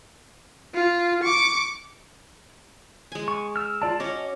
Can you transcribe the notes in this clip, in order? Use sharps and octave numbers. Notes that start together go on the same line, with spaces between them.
F4
C#6 D6
G#3 G#5
C#6
E6 F6
F4 D5 A5
C#4 F#4 C#5 D#5 D6